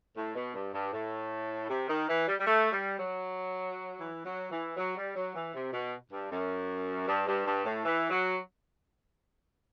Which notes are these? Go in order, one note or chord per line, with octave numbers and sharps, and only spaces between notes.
A2
B2
G2
G2
A2
C3
D#3
E3
G3
G3
A3
G3
F#3
E3
F#3
E3
F#3
G3
F#3
E3
C3
B2
G2
F#2
G2
G2
G2
A2
E3
F#3